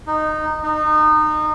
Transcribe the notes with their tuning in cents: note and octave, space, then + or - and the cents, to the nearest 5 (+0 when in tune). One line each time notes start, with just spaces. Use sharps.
D#4 -15
D#4 -30